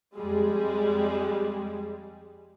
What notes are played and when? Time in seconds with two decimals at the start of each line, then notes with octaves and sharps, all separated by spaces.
0.16 F2 G3 G#3